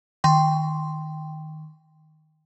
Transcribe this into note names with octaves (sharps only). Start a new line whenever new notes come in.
D#3 G5 C6